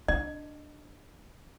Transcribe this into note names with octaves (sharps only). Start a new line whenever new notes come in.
D4 D#5